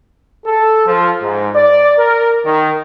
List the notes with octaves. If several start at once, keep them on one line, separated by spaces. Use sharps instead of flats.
A4
F3
G#2
D5
A#4
D#3